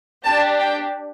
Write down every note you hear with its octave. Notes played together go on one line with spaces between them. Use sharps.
D4 G4 A5
G5